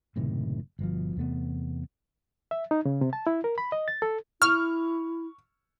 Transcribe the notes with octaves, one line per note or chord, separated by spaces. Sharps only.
F#1 A2 C3 D#3
G1 B2 F3
E2 C3 A3 B3
E5
D#4
C#3
C3
A5
E4
A#4
B5
D#5
A6
A4
E4 C#6 F6